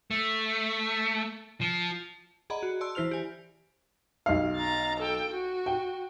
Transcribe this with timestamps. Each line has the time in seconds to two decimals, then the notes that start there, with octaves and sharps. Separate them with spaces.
0.11 A3
1.61 F3
2.50 G#4 D5 D#5 F#5 A#5 B5
2.63 F#4
2.81 D5 A5 C6 E6
2.95 E3 E4 C5 F6 F7
3.11 G4 G#5
4.26 B1 F5
4.56 A#5 A6
4.99 A4 G5
5.31 F#4
5.66 G5